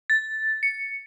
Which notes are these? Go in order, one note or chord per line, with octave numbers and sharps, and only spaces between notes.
A6
C#7